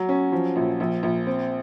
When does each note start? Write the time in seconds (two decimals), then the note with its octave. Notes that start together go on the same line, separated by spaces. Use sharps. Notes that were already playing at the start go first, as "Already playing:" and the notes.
Already playing: F#3
0.09 C#4
0.32 F3
0.56 A#1
0.80 A#1
1.03 A#1
1.27 C4